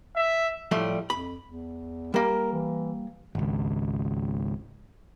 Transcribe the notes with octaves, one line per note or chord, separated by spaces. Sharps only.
E5
A2 F3 G3 A3
F2 B5
E2
G3 A#3 A#4
E3
G#1 C#2